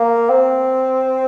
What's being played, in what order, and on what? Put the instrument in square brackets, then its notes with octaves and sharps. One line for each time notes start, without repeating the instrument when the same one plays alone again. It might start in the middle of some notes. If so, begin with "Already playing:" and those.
Already playing: [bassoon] A#3
C4